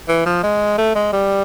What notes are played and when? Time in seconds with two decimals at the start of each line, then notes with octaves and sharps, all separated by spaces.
0.08 E3
0.26 F3
0.43 G#3
0.78 A3
0.95 G#3
1.13 G3